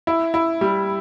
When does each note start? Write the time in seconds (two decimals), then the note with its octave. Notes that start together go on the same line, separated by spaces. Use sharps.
0.07 E4
0.34 E4
0.61 G3